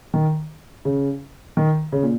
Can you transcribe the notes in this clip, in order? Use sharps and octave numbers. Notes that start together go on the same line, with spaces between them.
D#3
C#3
D#3
C#3
A#2